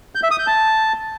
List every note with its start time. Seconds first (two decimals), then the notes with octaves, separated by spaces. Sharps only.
0.15 G6
0.23 E5
0.31 D#6
0.39 G6
0.47 A5